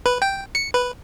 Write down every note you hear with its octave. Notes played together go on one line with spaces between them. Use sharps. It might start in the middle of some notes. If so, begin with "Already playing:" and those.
B4
G5
C#7
B4